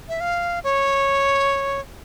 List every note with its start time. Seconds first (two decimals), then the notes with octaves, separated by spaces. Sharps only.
0.09 E5
0.20 F5
0.64 C#5